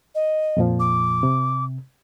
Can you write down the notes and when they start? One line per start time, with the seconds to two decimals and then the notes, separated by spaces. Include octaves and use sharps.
0.15 D#5
0.57 F2 A#2 F3
0.80 D6
1.23 C3